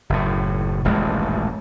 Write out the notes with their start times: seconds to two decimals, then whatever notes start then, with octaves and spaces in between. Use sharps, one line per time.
0.10 F#1 A2
0.85 D#1 A1 G2 G#3